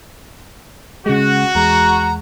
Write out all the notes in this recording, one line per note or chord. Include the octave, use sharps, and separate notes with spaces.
C#3 G#3 F#4
E2 G#3 A#5